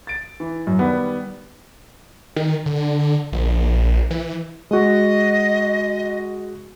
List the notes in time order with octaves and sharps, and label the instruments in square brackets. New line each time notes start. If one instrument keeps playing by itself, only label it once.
[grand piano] A6 D7
E3
F#2
D#3 G3 B3
[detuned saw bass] D#3
D3
A#1
E3
[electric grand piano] G#3 F#4 [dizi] D#5